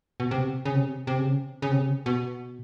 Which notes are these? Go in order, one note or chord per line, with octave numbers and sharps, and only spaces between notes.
B2
C3
C#3
C3
C3
C#3
C#3
C3
C#3
B2